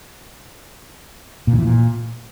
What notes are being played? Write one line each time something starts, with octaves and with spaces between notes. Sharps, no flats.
A#2
D#3
E3
A#2